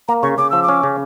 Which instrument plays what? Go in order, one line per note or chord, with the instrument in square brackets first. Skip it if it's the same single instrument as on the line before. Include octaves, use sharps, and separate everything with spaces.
[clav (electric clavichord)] A#3 [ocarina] A#5
[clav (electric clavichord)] C#3 [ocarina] C#6
[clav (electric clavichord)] C#3 [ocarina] D6
[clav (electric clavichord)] F3 [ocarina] E6
[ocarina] D6
[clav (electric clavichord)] C#4
C#3